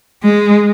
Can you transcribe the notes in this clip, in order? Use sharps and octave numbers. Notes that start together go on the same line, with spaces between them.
G#3